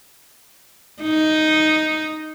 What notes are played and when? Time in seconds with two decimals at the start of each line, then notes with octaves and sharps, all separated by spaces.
1.02 D#4